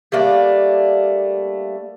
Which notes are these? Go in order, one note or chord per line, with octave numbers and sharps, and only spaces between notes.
G3 A3 A#3 D4